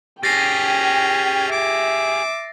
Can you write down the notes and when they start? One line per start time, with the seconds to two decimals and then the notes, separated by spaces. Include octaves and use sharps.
0.23 C#4 G4 G#4 G5 A6 A#6 C7
1.52 E5 D6